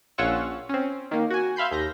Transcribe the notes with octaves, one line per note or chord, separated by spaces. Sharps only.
A#1 C#4 F4 F#5 C#6 E6
C4 C#4
D#3 A#3
F#4 G#5
E5 F5 B5 C6 G6
D#2 G6 A#6